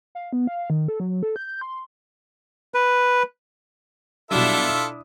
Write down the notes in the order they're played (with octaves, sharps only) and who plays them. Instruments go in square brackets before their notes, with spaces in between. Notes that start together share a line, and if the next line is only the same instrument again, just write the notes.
[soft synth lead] F5
B3
F5
D#3
A4
F#3
A4
G6
C6
[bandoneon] B4
[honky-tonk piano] B2 F#3 G3 [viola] D4 E4 [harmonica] F4 A4 E5
[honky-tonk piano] D#6